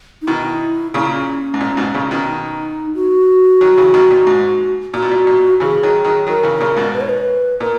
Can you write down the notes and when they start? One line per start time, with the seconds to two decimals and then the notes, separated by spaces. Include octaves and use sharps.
0.22 D#4
0.27 B2 D#3 E4
0.94 A#2 C#3 C#4
1.54 G#2
1.61 A#2
1.77 G#2 B2
1.94 A#2 C#3
2.11 B2 D#3
2.27 D#4
2.95 F#4
3.61 D#3 F#3
3.78 C#3 E3
3.94 B2 D#3
4.11 A#2
4.27 G#2
4.94 A#2 F#4
5.02 B2
5.11 A#2
5.27 A#2
5.60 C#3 E3 G#4
5.83 D#3 F#3
6.05 D#3 F#3
6.27 D#3 F#3 A#4
6.43 C#3 E3
6.60 A#2 C#3
6.77 G#2 B2
6.94 B4
7.01 C#5
7.09 B4
7.60 A#2 A#4